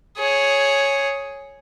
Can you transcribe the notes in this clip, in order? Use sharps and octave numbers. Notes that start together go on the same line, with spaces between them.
G#4 C#5